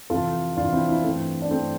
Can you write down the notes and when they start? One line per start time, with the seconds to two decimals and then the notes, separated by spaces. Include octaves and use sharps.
0.10 F2 C3 E3 F4 A4
0.56 F2 C3 E3 D4 F4
0.73 C4 E4
0.88 C4 E4
1.04 G2 E3 A3 C4
1.42 D4
1.51 G2 E3 A3 C4